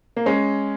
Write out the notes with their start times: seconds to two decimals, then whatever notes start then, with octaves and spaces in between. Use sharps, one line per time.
0.17 A#3
0.26 G#3 C#4